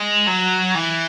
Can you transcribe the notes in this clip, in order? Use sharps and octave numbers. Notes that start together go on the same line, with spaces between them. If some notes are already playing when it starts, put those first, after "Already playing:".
Already playing: G#3
F#3
E3